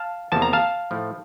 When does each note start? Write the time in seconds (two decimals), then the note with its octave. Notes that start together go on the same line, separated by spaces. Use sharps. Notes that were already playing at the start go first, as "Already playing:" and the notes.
Already playing: F5 A5
0.32 E2 C3 F3 A#3 A5
0.42 A#5
0.53 F5 A5
0.91 A2 F3 A3